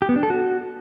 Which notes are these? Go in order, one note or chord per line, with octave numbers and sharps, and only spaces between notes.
G4
B3
D4
A4
F#4